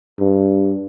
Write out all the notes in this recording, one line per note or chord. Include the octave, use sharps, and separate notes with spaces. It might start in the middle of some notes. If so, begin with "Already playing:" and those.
G2